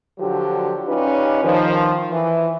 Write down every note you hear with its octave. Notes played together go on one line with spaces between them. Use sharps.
D3 F3 F#3 F#4 G4
C#4 D#4 F4 G4 B4 D5
D#3 F3
E3